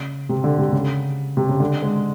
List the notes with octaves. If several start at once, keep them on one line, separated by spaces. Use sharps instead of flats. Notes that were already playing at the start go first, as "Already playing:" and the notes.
Already playing: C#3
C3
D3
C3
C#3
C3
C#3
D3
G#3